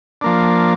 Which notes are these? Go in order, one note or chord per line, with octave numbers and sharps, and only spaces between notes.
F3 A#3 D4